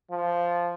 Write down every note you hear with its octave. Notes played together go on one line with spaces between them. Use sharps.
F3